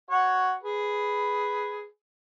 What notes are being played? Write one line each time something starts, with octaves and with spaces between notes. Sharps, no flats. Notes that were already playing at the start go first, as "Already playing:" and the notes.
F#4 C#5 F#5
G#4 B4